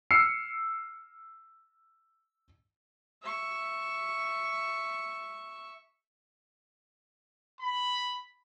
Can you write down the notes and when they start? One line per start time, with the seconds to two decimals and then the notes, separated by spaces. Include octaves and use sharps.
0.11 E6 F6 C7 C#7
3.22 E5 C#6
7.60 B5